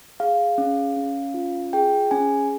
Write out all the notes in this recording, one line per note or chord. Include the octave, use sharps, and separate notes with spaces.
G#4 F5
C#4
C#4
F4
G#4 G5
C#4 G#5